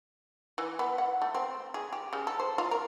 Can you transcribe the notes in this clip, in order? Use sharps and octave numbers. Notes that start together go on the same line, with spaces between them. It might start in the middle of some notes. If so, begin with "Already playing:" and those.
E3
B3
F#5
A3
C4
G#4
G4
C#3
A4
C5
F4
A#4